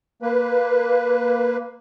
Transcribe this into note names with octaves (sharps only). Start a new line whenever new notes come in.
A#3 B4